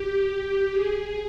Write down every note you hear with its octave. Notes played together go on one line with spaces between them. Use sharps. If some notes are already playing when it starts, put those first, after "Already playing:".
Already playing: G4
G#4